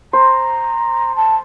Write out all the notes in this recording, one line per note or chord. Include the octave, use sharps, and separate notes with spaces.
C5 A#5
A5